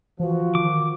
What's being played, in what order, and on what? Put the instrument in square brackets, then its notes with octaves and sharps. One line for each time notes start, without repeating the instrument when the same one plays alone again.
[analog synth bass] E3 [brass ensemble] F3 [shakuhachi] F#4
[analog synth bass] D#3 [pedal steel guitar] D6